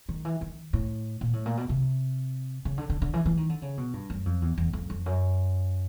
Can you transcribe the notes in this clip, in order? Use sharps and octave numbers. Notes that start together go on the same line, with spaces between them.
D#3
E3
D#3
A2
A#2
A2
A#2
B2
C3
C#3
D3
D3
D3
E3
E3
D#3
D3
C#3
B2
G2
F#2
F2
E2
E2
F2
F2
F#2